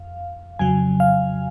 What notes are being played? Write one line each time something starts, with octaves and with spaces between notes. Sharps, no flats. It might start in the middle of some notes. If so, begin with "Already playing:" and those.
Already playing: F2 F5
F2 C#3 F#3 G#5
F5